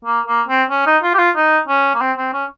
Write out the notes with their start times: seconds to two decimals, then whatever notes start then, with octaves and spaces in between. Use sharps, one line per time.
0.05 A#3
0.26 A#3
0.48 C4
0.70 C#4
0.86 D#4
1.03 F4
1.14 G4
1.19 F4
1.36 D#4
1.68 C#4
1.95 A#3
2.01 C4
2.18 C4
2.33 C#4